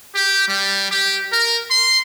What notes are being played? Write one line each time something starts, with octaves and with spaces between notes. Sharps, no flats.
G4
G3
G4
A#4
C6